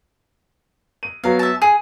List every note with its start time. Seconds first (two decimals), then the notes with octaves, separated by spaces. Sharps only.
1.03 D#7
1.24 F#3 B3 F5
1.39 E5 A5
1.62 G#4 D#7